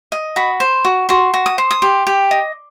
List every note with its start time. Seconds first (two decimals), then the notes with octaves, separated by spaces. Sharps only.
0.12 D#5
0.36 F#4 B5
0.60 C5
0.85 F#4
1.09 F#4 C6
1.34 F#4
1.46 D#6
1.58 C5
1.71 D#6
1.82 G4 C6
2.07 G4
2.31 D#5